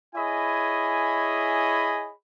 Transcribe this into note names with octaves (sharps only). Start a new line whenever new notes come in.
E4 G#4 C#5 D#5 G#5 B5